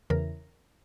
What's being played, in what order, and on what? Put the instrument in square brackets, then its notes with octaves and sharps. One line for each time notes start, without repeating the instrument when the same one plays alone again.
[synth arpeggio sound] E2 C#3 E3 A#4